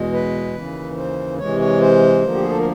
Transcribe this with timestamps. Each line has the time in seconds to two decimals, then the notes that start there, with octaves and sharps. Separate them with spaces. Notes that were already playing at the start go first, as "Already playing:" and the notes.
Already playing: E2 B2 G#3
0.13 B4
0.55 D#2 C#3 E3
0.96 C5
1.39 C3 E3 G#3 C#5
1.60 C#5
1.81 C5
2.23 D2 D3 F3 A#3
2.35 G4
2.42 G#4
2.50 A4
2.58 A#4